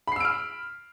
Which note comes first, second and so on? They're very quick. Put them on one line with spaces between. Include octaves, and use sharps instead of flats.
B5 C7 E6 D7 F6